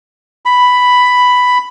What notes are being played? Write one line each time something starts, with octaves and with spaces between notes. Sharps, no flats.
B5